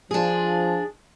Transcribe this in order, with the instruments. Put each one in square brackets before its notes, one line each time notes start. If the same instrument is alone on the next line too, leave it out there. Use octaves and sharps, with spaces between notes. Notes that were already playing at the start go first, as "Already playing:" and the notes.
[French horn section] F3 [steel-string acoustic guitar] D4 G#4